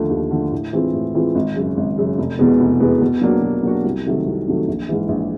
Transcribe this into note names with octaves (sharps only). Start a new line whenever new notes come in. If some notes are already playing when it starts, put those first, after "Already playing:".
Already playing: D#2 D3 F3 A3
D#2
D3 F3 A3
A2
E3 G#3 C4 F4
A2
E3 G#3 C4 F4
G#1
F#2 C#3
G#1
F#2 C#3
F1
E2 B2 G#3 B3
F1
E2 B2 G#3 B3
B2
F#3 A#3 D4 F#4
B2
F#3 A#3 D4 F#4
C2
C3 D#3 F#3 A3
C2
C3 D#3 F#3 A3
A#1
G#2 E3
A#1